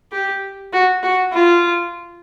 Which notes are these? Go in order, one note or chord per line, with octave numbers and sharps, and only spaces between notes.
G4
F#4
F#4
F4